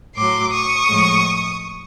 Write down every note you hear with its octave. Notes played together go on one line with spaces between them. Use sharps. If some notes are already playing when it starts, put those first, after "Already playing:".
A2 F#3 C6 D6
C#6 D#6
A2 F3 G#3